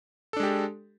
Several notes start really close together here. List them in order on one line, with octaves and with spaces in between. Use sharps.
A4 D4 G#3 G4